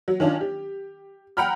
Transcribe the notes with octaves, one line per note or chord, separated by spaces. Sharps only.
F#3
D#3 C#4 D4 F4
G4
F#5 G5 A#5 B5 F6